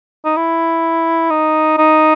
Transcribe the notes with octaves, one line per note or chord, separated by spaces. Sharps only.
D#4
E4
D#4
D#4